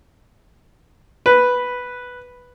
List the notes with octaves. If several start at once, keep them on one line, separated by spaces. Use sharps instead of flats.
B4